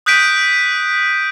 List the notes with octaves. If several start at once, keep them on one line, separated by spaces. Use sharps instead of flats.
D#6 F#6 G6 B6 D7 D#7